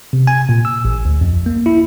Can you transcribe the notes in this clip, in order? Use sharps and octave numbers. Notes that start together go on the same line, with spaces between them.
C3
G#5
A#2
E6
A1
D2
F2
A#3
E4